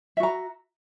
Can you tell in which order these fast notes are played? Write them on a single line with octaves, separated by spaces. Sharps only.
E5 F#4 A#5